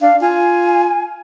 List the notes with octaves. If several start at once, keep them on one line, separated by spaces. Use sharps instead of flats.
D4 F5
F4 G#5